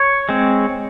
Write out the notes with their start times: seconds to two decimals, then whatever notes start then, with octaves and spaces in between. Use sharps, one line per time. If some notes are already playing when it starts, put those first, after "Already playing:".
Already playing: C#5
0.29 G#3 C4